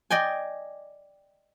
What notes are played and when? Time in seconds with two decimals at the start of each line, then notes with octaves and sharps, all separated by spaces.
0.11 D5 D#5 G5 G#5